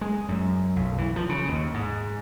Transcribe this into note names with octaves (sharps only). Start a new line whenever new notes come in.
G#3
F#2
B1
E3
F3
C#3
D#2
G#2